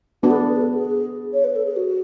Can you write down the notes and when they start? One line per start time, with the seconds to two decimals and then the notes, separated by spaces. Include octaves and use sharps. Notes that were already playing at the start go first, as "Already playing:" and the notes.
0.23 B3 D4 F#4
0.31 A4
0.36 G#4
0.49 B4
0.56 G#4
0.61 A4
0.74 G#4
1.33 C#5
1.44 B4
1.56 A4
1.65 G#4
1.76 F#4